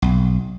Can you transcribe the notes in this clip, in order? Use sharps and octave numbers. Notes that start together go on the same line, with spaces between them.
B1